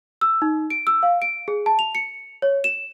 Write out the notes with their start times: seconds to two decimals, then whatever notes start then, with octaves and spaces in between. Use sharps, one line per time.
0.21 E6
0.42 D#4
0.70 D7
0.87 E6
1.03 F5
1.22 D7
1.48 G#4
1.66 A5
1.79 F7
1.95 C#7
2.42 C#5
2.64 E7